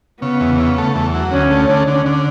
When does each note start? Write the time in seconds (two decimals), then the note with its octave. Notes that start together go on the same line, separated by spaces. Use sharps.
0.22 C#3 B3
0.41 E2
0.59 C#3
0.78 A3
0.95 E2
1.14 F#3
1.32 D2 C#4
1.51 A3
1.69 D3
1.87 D3 C#4
2.06 D3